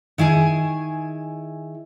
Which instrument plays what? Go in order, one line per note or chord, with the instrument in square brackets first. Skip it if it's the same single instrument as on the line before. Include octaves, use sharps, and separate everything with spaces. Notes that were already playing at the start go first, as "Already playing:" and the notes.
[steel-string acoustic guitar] D#3 E4 G#4 G#5